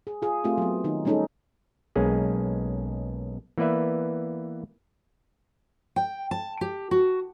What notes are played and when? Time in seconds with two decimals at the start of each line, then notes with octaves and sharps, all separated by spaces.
0.07 G#4
0.22 F4 G#4
0.44 A3 C4 F4 G4
0.58 F#3 B3
0.84 D#3 D#4
1.05 G3 A3 C#4 D#4 G#4 A4
1.96 B1 G#3 A#3 C#4 G#4
3.58 E3 A#3 B3 B4 D5 E5
5.96 G5
6.31 A5
6.61 G4
6.91 F#4